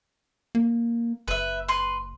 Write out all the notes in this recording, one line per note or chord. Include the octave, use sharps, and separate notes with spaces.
A#3
F#1 B4 E5
B4 C6